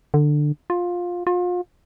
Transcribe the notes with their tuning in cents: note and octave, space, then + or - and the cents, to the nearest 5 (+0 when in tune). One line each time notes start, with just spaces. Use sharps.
D3 +15
F4 +15
F4 +35